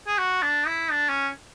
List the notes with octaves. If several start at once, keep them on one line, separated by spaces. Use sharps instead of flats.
G#4
F#4
D4
E4
D4
C#4